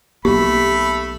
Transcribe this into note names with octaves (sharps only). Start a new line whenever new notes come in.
B1 A3 A#3 G4 B5